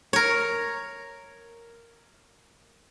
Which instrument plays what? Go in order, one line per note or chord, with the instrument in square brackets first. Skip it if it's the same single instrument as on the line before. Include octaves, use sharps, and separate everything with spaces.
[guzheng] A#4 C#5